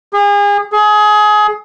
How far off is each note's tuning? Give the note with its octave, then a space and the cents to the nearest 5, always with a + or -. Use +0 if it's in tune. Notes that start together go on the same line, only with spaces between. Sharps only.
G#4 -35
G#4 +25